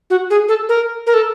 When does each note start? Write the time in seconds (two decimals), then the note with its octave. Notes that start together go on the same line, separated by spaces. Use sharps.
0.10 F#4
0.30 G#4
0.48 A4
0.69 A#4
1.07 A#4
1.14 A4